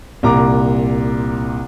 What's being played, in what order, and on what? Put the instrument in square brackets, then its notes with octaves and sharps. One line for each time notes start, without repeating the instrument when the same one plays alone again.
[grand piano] C2 A#2 A#5 D6